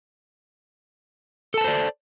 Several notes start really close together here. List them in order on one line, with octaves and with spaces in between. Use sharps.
A4 A5 B4 C5 D5